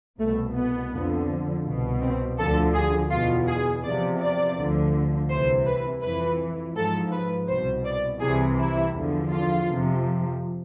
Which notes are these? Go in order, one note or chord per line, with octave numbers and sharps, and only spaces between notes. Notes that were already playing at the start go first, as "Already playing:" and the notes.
C2 B2 A3
B3
F2 D3 F3
C2 B2
C4
D2 D3 F3 A4
G#4
E2 B2 F4
G#4
E2 C3 F3 D5
D5
D2 D3 F3
C2 C3 E3 C5
B4
F2 E3 B4
G#2 F3 A4
B4
C2 B2 C5
D5
C2 C3 E3 G#4
E4
E2 D3 F3
F4
F2 C3 F3